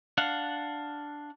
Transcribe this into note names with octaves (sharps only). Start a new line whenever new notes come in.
D4 F5 F#5